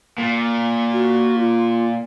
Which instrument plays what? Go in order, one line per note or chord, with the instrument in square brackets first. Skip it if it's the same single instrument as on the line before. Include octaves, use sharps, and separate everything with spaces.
[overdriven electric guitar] A#2
[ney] F#4
F4